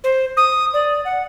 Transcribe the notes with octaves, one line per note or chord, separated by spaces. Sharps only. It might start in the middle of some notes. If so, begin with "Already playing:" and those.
C5
D#6
D5
F#5